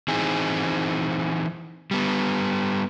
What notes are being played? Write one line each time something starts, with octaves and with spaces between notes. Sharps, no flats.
E3 C4 D#4 G#4
G3 B3